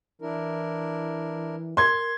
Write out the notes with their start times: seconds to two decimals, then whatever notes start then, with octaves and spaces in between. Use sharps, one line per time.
0.22 E3 D4 E4 A#4
1.77 A#4 C6 G#6